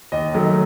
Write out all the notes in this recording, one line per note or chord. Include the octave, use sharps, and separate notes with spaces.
D#2 D#5
D#3 F#3 A3